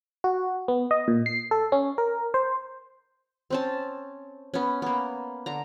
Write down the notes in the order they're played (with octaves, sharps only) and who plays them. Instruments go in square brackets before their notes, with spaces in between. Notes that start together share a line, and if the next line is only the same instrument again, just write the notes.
[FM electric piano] F#4
B3
D#5
A#2
C7
A4
C#4
A#4
C5
[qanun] C4 C#4 A5
B3 C#4
A#3 B3
D3 A#5